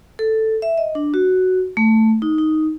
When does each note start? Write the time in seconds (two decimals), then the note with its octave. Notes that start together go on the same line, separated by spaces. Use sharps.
0.19 A4
0.62 E5
0.78 D#5
0.95 D4
1.14 F#4
1.77 A3
2.22 D#4
2.38 D#4